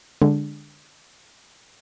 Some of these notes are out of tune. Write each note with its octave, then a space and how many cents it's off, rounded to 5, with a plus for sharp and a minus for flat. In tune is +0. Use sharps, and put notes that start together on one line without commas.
D3 +0 G#3 -20